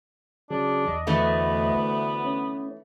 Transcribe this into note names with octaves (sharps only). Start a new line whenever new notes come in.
C#3 F#3 D4 G#4
E2 D#5
D2 E3 A3 B3
C#4